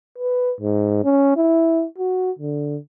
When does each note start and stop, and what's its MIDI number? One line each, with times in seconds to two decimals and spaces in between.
0.18 0.53 71
0.60 1.02 44
1.04 1.36 61
1.36 1.85 64
1.98 2.31 66
2.39 2.78 50